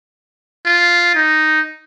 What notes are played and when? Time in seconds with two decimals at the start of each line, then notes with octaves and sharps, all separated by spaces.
0.66 F4
1.15 D#4